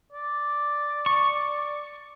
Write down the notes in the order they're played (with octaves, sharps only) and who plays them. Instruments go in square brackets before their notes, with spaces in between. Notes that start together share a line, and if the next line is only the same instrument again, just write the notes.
[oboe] D5
[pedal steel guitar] C#6